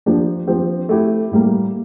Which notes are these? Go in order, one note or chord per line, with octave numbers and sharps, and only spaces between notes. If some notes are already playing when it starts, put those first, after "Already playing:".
F3 A#3 D4 G4
F3 C4 G4
A3 E4 G4
A2 G3 A#3